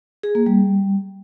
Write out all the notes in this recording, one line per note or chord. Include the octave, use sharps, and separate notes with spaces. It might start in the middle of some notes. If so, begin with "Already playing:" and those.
G#4
A#3
G3